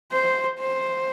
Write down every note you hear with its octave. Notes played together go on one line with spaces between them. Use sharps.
C5
C5